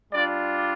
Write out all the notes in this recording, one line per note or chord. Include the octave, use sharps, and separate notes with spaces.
G3 D4 F4 D5